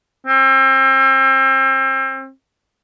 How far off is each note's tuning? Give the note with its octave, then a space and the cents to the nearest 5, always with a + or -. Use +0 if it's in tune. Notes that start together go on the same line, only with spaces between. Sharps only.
C4 +35